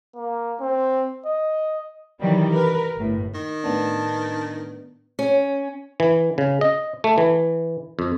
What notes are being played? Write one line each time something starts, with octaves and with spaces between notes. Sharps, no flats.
A#3
C4
D#5
C3 D#3 E3 F#3 G3
A#4 B4
G1 A2
D#3
A2 B3 D4 A5
C#4
E3
C#3
D#5
A3
E3
F2